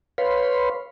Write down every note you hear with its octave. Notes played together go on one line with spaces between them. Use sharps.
B4 C#5 F5 B5 C6